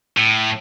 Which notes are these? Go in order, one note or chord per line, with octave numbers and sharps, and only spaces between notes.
A2